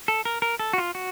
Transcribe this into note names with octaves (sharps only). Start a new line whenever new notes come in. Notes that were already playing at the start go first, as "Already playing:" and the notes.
A4
A#4
A#4
A4
F#4
F4
F#4